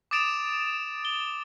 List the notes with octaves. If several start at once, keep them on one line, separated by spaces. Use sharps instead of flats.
D6 D#6 A6 D7 E7 F7
G7